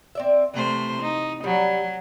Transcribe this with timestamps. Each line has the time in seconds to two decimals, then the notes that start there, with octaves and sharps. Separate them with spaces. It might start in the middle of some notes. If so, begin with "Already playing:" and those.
0.15 C4 D5 E5
0.54 C3 E3 A3 C5
1.02 D#4
1.44 F#3 G3